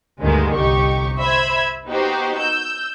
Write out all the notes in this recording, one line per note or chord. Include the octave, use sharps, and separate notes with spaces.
D2 G2 D3 D#3 G#3 B3
G1 C2 D#4 G4 C#6
C5 E5 B5 E6 G#6
B3 D#4 F#4 G4 C5
E6 G6